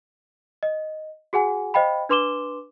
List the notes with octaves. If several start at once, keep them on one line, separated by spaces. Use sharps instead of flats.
D#5
F#4 G#4 F#5 G#5
C5 D#5 F5 G5 B5
D4 B4 C6 D6 E7 G7